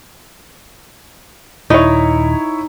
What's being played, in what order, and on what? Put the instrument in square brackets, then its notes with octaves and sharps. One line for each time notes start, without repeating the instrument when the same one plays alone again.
[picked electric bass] D#1 [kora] D#4 [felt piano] E4 C#5